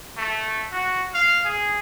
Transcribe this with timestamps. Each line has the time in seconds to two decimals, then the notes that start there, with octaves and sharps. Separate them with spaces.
0.17 A3
0.72 F#4
1.14 F5
1.45 G#4